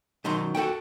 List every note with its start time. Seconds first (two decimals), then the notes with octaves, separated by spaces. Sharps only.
0.24 B2 D#3 F#3 A#5 C6
0.55 F#4 A4 F#5 G5